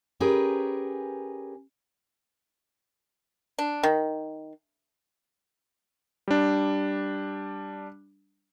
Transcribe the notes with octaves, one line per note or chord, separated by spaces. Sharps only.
C#4 G4 G#4 A#4 B4
D4
D#3
G3 D4